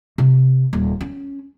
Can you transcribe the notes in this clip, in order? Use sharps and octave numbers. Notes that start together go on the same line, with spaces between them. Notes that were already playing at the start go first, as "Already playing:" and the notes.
C3
D#1
C#4